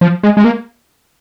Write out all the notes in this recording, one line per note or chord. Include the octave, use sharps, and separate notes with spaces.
F3
G#3
G#3
A#3